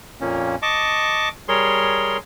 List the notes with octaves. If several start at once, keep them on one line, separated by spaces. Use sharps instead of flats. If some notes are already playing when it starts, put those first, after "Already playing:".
F2 A#2 F3 A#3 C#4
D#5 A5 C#6 D6
G3 G#4 A#4 C#5 C6